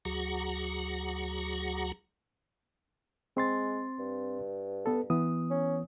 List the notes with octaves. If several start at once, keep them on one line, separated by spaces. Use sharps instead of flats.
D2 F#3 F#4 G#4 F#5 A#5
G#3 C4 C6 A6
G2
B3 A4
E3 B3 D#6
C#4